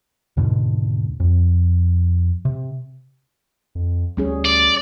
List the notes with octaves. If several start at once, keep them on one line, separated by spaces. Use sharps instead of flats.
D#2 G#2 B2 D3
F2
C3
F2
D2 G3 C#4 G#4
D5